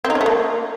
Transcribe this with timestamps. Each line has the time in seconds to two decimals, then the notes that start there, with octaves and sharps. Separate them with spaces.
0.04 C4
0.10 D#4
0.15 C#4
0.21 A3
0.26 A#3